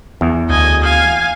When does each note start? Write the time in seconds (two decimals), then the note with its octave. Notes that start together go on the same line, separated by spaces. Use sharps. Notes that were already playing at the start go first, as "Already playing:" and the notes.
0.21 E2
0.50 D2 D#5 G#5
0.83 F5 G#5